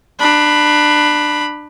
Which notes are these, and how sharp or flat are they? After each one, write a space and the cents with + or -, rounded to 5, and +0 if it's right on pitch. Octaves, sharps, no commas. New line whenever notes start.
D4 +25 B5 +0